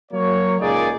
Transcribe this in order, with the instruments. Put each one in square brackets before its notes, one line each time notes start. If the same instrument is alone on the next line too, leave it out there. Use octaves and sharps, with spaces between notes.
[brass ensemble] F#3 A#3 C#5
C#2 A#2 A#3 D#4 G#4 D5